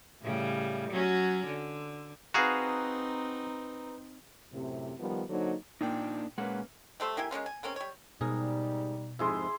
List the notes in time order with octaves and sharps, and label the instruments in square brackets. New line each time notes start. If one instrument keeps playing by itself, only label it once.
[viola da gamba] A2 C#3 G3
F#3 C#4 F#4
D3
[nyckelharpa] C4 D#4 [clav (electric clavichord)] F#4 G#4 F5 [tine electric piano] B4 A#5
[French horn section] F#2 A2 C3
D#3 F3 G3 B3
D3 F#3 A#3 D#4 C5
[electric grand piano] A#2 G5 [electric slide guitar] A#3 D4 D#4
[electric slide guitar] A#2 G#3 F#5 [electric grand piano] A#3 C#4 B4
[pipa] G3 A3 C5 E5
A#3 E4 G4 G#5
G#3 A#3 C#4 F4
G#5
C#3 A#3 C4 C#4
G3 C#5
[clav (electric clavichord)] G#2 G#4 A#4 [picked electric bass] B2 [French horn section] G3 D#4
[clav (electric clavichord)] F2 G#2 C3 [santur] E4 G#4 C6